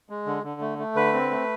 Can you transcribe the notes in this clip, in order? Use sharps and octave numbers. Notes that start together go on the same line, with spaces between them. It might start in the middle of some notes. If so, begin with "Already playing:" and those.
G#3
D3
D3
A3
A3
D3 B4
C4
A3